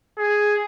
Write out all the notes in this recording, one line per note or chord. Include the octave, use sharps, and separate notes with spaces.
G#4